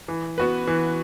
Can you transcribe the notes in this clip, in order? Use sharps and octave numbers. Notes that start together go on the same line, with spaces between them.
E3
B3 F#4 B4
E3